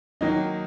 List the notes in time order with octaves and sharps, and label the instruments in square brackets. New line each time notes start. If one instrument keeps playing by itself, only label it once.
[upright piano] D#3 F#3 A#3 [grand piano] D#4